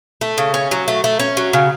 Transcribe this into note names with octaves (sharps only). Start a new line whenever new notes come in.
A3
C#3
C#4
F#3
A3
A3
C#4
F#3
C#3